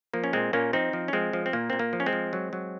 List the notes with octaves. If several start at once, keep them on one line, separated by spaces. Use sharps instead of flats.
F3 A#3
C#4
A#2 G#3 C4
A#2 A#3 C#4
F3 C4 D#4
F3
C#4
F3 G#3 C4
F3
C4
A#2 A#3
A#2 C4
A#3
F3
C#4
G#3 C4
F3
F#3
F#3